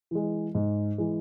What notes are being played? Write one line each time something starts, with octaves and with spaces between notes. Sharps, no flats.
E3 G#3
G#2
E3 G#3